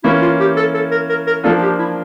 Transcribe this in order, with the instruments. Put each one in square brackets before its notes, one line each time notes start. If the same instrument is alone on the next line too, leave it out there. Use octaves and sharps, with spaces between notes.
[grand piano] E3 A#3 C#4 [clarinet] E4
[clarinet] F4
G4
A4
A4
A#4
A#4
A#4
[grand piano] F3 A#3 D4 F4 [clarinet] A4
[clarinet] G4
E4